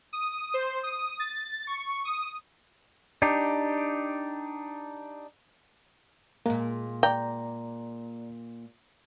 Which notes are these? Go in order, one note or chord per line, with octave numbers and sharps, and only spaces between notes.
D#6
C5
D#6
A6
C#6
D#6
D4 D#4 G4
A#2 G#3 A#3
D5 G5 A#5